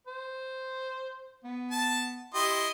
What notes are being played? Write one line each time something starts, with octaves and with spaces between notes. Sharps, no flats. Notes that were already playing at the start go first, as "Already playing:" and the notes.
C5
B3
A5
E4 G4 D#5 C6